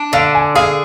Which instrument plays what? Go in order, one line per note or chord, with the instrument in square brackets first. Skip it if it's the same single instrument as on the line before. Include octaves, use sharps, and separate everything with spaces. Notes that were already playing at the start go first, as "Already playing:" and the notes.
Already playing: [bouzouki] D4
[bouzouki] D3 [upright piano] F5
[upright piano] G#5
[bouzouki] G#4 [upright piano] F5